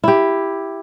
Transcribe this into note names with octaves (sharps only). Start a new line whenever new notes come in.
E4 G4